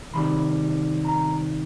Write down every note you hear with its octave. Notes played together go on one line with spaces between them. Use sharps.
C3 D#3 G3 B5
A#5